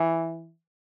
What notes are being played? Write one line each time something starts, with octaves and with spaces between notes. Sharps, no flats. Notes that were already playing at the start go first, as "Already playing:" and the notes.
Already playing: E3